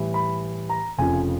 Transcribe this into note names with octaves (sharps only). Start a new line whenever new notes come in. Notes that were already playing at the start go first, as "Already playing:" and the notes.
Already playing: A2 E3 G3
B5
A#5
F1 F2 C#3 F3 G#5